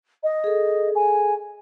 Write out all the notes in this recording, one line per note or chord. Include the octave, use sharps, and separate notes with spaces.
D#5
G#4 A4
G#5